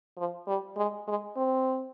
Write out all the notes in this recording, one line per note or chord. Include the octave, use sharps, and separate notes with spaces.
F3
G3
G#3
G#3
C4